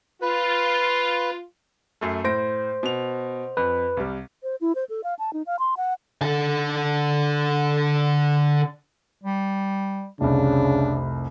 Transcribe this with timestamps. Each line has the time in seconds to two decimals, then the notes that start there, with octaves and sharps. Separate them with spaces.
0.22 F4 B4
2.01 F#2 A3
2.24 A2 C5 A#6 D7
2.83 B2 F7
3.57 F2 B4
3.97 C2 G3
4.43 C5
4.61 E4
4.75 C5
4.89 A4
5.04 F5
5.19 A5
5.33 D#4
5.47 F5
5.59 C6
5.77 F#5
6.21 D3 A4
9.24 G3
10.21 F1 C2 C#3 D4